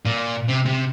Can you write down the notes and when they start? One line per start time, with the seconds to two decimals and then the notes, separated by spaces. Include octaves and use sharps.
0.05 A#2
0.48 C3
0.65 C3